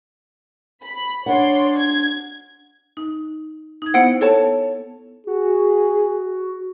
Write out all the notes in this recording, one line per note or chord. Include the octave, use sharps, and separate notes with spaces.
B5
D4 C#5 D5 F#5 C6
G#6
D#4
D#4 G#6
B3 E4 C5 F#5
A4 C#5 A5
F#4 G#4